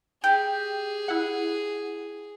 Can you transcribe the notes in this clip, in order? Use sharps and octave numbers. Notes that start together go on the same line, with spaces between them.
G4 G#4 G5
E4 F#5